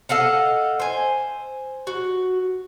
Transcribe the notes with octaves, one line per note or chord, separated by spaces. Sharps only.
A4 D#5 F5 F#5
C5 G#5
F#4